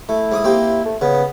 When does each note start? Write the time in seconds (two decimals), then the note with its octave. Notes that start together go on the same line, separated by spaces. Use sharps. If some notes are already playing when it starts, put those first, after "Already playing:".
0.09 A3 E4
0.32 G#2 D6 D#6
0.44 A#3 C4 G4
0.85 A3
1.01 C#3 B3